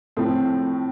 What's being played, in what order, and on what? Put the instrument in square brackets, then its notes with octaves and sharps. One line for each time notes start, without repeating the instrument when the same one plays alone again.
[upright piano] A2 F3 A3 C4